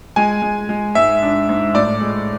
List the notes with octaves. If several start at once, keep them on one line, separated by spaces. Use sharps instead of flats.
G#3 G#5
G#3
G#3
G#2 E5
D4
G#2
A2 D5
G#3